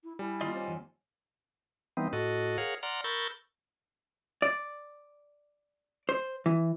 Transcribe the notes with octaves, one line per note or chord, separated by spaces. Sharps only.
E4
G3 E4 G#5
D#3 A#3 F4 D5 D#5
C4 C#5 F#5 G#5
F2 E3 C6
E3 G3 B3 C4 D#4
A2 F#4 A4 D#5
G#4 A#4 C#5 F5 F#5
D5 F#5 A#5 C6 F6
A#4 B5 C#6 E6 G6 A6
D5
C5
E3